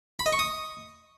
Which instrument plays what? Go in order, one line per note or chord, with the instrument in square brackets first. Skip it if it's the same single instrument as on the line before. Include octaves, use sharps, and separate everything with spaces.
[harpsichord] B5
D#5
C#6
D#6